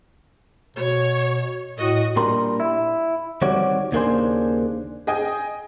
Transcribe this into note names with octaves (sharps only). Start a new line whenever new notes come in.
B2 C#5
A2 F#4 D#5
A#2 G3 D4 A#4 C6
E4
D#3 G3 C4 F#4 C#5 D5
D#2 C#3 A#3 D4 G#4 C5
G#4 D#5 G5 G#5